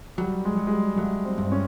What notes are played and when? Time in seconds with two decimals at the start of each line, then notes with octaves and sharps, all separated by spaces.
0.18 F#3 G3
0.45 G#3
0.57 F#3
0.67 G#3
0.71 G3
0.98 F#3 A3
1.25 C4
1.38 G2
1.44 C4
1.52 C#4